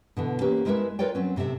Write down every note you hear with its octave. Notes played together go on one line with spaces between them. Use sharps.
B2 D3 E3
A#3 C#4 G4 B4
G3 G#3 E4 A#4 B4 E5
F4 A#4 B4 C#5 D5 G5
F#3 C4 C#4
A2 C3 F3 C4 E5